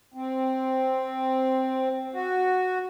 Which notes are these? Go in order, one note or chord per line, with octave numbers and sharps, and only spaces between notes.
C4
F#4